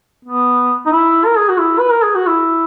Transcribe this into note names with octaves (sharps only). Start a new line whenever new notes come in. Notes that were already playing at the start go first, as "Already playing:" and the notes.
B3
D#4
E4
A#4
G#4
F#4
E4
B4
A#4
G#4
F#4
E4